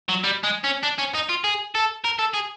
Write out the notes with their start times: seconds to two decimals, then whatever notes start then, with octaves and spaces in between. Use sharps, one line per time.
0.09 F#3
0.24 G3
0.44 G#3
0.64 C#4
0.83 D4
0.99 C#4
1.15 D#4
1.29 F4
1.44 G#4
1.75 A4
2.05 A#4
2.19 A4
2.34 G#4